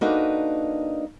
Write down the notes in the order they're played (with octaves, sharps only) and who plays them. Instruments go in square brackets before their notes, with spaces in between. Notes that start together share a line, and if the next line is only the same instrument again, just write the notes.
[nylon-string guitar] A#3 D4 D#4 F#4 A4 B4